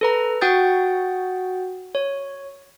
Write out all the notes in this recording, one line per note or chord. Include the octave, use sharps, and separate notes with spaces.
A4 B4 A#5
F#4 F#5 G5 D#6 G6 A6
C#5